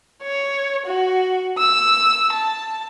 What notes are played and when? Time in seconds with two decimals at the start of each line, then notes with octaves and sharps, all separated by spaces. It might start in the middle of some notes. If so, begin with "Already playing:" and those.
0.23 C#5
0.86 F#4
1.58 E6
2.32 A5